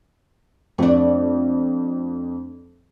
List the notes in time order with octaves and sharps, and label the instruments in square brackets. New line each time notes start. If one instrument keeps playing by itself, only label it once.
[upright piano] F2 [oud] A3 D4